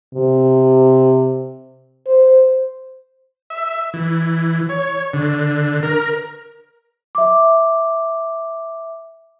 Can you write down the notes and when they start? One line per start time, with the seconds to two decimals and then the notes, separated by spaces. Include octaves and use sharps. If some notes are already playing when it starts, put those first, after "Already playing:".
0.14 C3
2.07 C5
3.50 E5
3.94 E3
4.69 C#5
5.13 D3
5.83 A#4
7.15 E5 D6